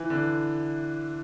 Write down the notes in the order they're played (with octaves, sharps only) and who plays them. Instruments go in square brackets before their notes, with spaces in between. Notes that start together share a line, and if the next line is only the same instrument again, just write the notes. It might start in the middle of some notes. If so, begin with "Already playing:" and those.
Already playing: [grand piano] E3
D3